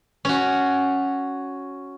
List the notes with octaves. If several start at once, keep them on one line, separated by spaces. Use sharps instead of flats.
C#4 F#4